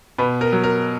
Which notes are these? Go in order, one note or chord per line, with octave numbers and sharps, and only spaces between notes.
B2 B4
A#4
F#3
A#4